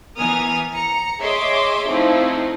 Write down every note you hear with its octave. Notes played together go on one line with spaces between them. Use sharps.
E3 B3 A#4 G#5 D#6 F6
A#5 C#7
G#4 C#5 D#5 E5 C6 D6
F3 A3 C4 D#4 E4